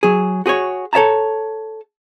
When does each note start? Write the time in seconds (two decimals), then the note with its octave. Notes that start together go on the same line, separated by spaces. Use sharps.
0.03 F#3 G#4
0.46 F#4 G#4 C5 C#5
0.93 A4 C#5 E5 A5 A#5